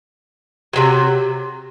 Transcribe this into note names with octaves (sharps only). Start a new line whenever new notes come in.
C3 D#3 F#3